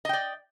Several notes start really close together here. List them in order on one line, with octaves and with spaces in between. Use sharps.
D#5 G5 D5